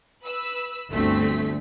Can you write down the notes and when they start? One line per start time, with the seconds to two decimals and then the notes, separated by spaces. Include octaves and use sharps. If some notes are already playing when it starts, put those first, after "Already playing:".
0.24 B4 E6
0.91 G1 D2 A3 C4 B6